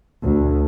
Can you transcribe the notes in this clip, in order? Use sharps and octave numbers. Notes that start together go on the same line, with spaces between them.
D2